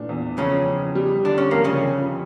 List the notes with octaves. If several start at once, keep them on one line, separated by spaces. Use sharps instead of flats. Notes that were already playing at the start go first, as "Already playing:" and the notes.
Already playing: A#2 E3 A3 D4
E2
F2 C#3 C#4
F2
G3
D3 D4
C#4
F2 A#3
C#3 C#4
F2